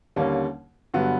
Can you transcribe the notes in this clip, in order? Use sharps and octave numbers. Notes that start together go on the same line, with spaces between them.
D#2 D3 G3 A#3 C#4
G2 D3 F#3 B3